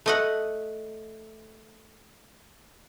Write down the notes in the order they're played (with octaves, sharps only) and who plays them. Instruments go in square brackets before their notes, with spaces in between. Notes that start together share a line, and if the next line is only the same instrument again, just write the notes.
[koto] A3 D#5 F#5